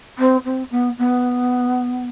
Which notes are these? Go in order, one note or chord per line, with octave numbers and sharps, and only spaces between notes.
C4
C4
B3
B3